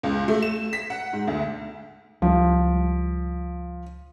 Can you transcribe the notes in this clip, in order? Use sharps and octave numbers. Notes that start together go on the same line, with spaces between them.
C#2
A3
E7
B6
F#5
G#2
D2
C#2 F3 G3